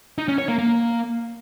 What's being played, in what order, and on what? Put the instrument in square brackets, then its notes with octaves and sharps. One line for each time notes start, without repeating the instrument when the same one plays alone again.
[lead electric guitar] D#4
C#4
C#5
A#3
A#3